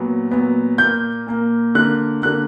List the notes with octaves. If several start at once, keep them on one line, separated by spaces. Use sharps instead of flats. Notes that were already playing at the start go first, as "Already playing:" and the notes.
Already playing: A#2 F#3 B3
A#2 F#3 B3
A#2 A#3 G6
A#2 A#3
D3 A#3 F#6
D3 A#3 F#6